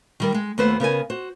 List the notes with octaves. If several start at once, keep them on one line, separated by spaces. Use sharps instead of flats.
D#3 G3 A#4
G#3
D#2 A3 B3 F#4 B4 C5
C#3 B3 A#4 G#5
F#4 C5